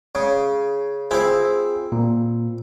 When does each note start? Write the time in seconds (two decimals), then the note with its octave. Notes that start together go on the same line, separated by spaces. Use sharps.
0.15 C#3
1.11 C4 E4 F4 G#4 C5
1.92 A#2